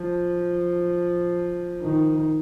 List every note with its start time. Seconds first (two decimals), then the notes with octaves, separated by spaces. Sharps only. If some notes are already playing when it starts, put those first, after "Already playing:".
Already playing: F3
1.82 D#3